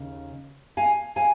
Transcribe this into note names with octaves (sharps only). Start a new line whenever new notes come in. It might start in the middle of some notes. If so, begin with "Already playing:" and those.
Already playing: D#2 C#3
F5 G#5
F5 G#5